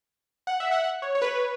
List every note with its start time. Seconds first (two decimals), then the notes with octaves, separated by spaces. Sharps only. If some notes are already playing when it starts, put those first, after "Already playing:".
0.47 F#5
0.60 E5
0.71 F#5
0.84 F#5
1.02 C#5
1.15 C#5
1.22 B4